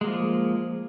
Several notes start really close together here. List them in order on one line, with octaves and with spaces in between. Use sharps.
G#3 A#3 F3